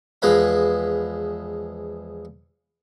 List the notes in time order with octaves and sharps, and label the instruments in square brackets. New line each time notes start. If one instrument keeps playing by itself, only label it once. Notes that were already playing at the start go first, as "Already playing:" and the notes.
[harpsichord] E2 F3 G#3 B4 D#5 B5